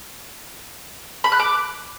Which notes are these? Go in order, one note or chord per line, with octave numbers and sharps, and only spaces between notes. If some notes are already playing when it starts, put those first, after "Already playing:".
B5
F#6
D6